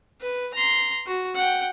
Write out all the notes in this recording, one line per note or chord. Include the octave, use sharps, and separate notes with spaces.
B4
A#5 C6
F#4
F#5 G5